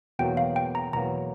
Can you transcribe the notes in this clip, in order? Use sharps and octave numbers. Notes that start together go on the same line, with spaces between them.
E2 B2 F#3 A#3 G5
F5
G5
A#5
E2 B2 F#3 A#3 A#5